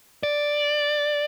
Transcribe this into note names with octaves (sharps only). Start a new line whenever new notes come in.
D5